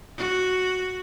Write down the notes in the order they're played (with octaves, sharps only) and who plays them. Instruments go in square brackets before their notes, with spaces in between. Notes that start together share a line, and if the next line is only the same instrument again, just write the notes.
[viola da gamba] F#4